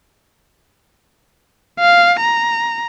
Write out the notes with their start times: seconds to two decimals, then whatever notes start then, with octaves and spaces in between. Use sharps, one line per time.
1.79 F5
2.21 A#5